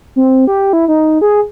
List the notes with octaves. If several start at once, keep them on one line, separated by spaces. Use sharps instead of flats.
C4
G4
E4
D#4
G#4